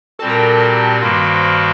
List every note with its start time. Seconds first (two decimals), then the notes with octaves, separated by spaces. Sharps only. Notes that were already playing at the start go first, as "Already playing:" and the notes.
0.19 A#2 G3 C4 F#4 A4 A5
0.29 A#4 A#5
0.39 G4 G5
0.50 G4 G5
0.60 A4 A5
1.00 G2 D#3 G3 A#3 F#4 C5 C6
1.41 C5 C6